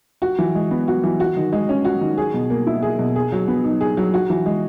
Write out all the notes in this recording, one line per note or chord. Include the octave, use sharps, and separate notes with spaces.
F#4
E3
G#3
B3
F#4
E3
F#4
D#3
G#3
C#4
F#4
D#3
G#4
B2
A#3
E4
G#4
B2
G#4
F#3
B3
D#4
G#4
F#3
F#4
E3
G#3